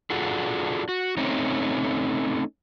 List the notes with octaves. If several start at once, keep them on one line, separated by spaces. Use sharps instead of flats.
D4 F4 F#4 G#4 A4
F#4
A3 C4 C#4 D#4